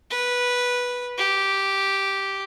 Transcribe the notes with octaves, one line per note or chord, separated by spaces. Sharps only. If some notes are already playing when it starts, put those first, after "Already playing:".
B4
G4